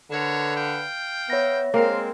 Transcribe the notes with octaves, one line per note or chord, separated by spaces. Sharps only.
D3 A#4 B4 C#5
F5 G5
B3 C#5 E5 A#6
G#3 A#3 C4 F5